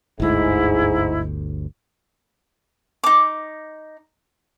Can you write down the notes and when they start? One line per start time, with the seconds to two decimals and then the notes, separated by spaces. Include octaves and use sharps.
0.20 G1 D2 G#2 E4
3.04 D#4 D6